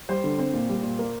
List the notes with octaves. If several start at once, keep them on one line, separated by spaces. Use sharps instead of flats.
G3 C5
D3
C4 C5
A#2
G3
A#2
A#3